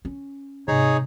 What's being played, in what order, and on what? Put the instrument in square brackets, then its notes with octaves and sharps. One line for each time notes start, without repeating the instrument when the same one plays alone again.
[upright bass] C#4
[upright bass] G#2 C3 [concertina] D#4 G#4 C#5